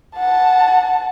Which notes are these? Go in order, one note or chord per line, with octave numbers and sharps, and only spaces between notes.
F#5 A5